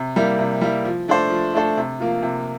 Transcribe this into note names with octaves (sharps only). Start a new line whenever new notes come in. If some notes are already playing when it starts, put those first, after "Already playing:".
Already playing: C3
G3 A#3 E4
C3
G3 A#3 E4
F3
A3 D4 A4 C5
F3
A3 D4 A4 C5
C3
F3 A#3 F4
C3